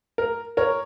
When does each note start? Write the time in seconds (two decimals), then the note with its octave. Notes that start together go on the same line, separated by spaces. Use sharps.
0.18 A#4
0.57 A#4 C#5